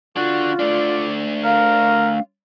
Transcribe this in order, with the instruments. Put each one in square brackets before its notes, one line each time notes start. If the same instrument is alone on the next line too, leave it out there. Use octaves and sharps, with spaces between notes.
[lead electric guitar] D3 D4 [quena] F4 [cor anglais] F#4
[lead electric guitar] A3 D4 [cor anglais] D5
[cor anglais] A#4 [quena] F5